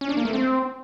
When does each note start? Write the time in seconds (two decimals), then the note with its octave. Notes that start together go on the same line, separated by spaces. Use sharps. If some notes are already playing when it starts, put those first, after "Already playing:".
0.01 C#4
0.09 D4
0.17 A#3
0.25 A3
0.33 C4